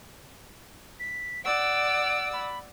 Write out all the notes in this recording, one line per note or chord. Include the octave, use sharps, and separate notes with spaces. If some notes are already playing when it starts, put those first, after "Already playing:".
B6
D5 F#5 E6 D7
B5